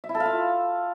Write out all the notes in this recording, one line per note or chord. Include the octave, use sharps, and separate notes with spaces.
E5
E4
A4
F5
F4